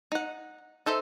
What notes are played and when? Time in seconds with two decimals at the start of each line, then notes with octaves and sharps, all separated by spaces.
0.12 D#4 F#5
0.86 D#4 A4 C5 E5